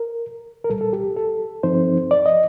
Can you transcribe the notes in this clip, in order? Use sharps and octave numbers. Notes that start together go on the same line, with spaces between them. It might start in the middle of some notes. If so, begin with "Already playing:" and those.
Already playing: A#4
A#4
C2 A#2 G3 A4
A4
G4
A4
G2 F3 C4 D#4 C5
D5
D#5